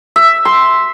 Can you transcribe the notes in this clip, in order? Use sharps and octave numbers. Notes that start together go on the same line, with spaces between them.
E5
C6